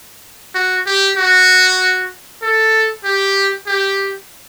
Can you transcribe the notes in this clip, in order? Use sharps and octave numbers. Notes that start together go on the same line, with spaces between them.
F#4
G4
F#4
A4
G4
G4